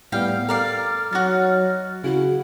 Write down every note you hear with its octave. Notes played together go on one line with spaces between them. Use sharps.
A2 G3 B3 F5 G5 F6
A4 A#4 D5 F5
F#3 D#4 F#4 F#6 A6
C#3 E4 F#4